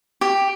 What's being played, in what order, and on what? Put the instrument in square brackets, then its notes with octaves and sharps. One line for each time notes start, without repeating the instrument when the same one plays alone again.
[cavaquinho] G4